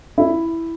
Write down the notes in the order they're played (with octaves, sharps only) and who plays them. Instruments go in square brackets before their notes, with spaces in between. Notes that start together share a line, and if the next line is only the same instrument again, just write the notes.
[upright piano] E4